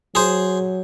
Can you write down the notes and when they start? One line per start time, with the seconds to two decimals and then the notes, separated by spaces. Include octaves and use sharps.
0.15 F#3 G#4 C5